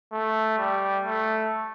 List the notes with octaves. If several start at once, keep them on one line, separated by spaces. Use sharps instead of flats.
A3
G3
A3